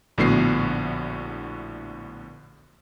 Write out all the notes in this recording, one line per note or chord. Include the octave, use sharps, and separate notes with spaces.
A#1 A2 D3 B3 F#4 C7